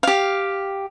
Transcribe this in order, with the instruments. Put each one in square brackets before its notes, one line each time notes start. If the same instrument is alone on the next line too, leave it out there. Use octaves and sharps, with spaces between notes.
[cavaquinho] G4 F5